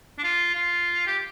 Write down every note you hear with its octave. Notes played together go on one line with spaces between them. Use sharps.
D4
F4
F4
G4